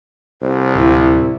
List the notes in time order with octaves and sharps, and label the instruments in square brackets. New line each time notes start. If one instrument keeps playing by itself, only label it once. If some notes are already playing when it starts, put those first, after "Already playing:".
[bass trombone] C2 [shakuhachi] C5
[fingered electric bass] D1 [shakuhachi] E4